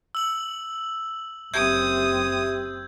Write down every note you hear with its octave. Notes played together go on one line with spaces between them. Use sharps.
E6 F#7
F#1 C4 G4 E5 D#6 G6 G#6